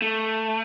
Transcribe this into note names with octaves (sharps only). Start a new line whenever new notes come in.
A3